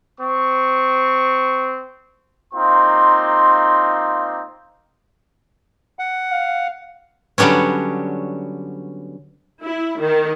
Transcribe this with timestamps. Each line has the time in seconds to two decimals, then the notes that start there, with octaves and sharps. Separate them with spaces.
0.21 C4 C#6
2.54 A#3 C4 D#4 F4 C6
5.99 F#5
6.31 F5
7.38 D3 F#3 G3 B3 C#4
9.63 E4
10.01 D#3